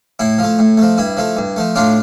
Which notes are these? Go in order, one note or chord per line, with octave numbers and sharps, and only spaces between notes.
A2 E4
F3 A3
A2
F3 A3
G2 E4
F3 A3
G2
F3 A3
A2 D4 F4